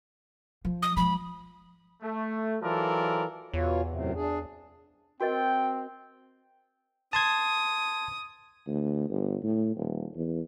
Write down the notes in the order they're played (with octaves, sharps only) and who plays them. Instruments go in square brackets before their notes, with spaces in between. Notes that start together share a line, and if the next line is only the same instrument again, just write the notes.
[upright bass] F3
[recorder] D#6
[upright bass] F3 G#3 [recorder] B5
[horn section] A3
E3 F#3 F4 A4 A#4 D5
[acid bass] E2 [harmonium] B2 F4 C#5
[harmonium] F#2 A2 C3
D4 G#4
[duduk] C4 [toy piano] F#4 A#4 D#5 [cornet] G5
[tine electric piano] A5 C6 G#6 [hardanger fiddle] D#6
[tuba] D2
G1
A2
D#1
E2